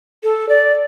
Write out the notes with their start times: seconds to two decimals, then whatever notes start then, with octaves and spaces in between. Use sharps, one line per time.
0.23 A4
0.49 D5